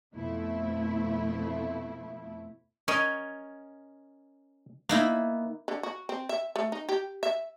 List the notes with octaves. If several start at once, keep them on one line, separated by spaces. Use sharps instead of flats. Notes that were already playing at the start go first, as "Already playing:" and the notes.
F2 B2 F3 A3 E4
C#4 A#4 C#5 D#5
A#3 B3 D#4 E4
D3
F#4
C4
E5
A3
D#4
G4
E5